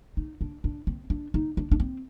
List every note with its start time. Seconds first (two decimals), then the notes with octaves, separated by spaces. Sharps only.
0.17 D#4
0.41 D4
0.64 D4
0.87 C4
1.10 D4
1.34 D#4
1.57 D4
1.71 D4
1.80 C4